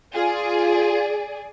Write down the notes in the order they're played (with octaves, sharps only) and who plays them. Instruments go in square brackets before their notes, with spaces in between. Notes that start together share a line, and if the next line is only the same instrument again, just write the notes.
[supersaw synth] F4 [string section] G#4 D5